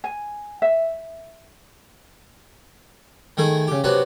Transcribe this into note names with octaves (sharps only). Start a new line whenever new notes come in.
G#5
E5
D#3 A3 E4 G#4
C#3 G4
C3 F#3 B3 D4 B4